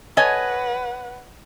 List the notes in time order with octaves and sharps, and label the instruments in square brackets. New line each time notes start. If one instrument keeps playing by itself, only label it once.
[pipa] A4 G#5 [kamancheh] B4 F#5 [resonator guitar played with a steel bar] C#5 D#5